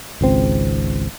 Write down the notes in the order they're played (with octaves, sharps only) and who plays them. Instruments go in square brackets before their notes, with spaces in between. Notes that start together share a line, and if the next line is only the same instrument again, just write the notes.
[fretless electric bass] G#1 C#2 C4